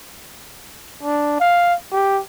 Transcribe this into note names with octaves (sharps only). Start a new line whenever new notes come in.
D4
F5
G4